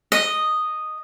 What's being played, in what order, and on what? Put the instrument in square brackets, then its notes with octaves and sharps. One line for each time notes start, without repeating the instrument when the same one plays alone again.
[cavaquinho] D#5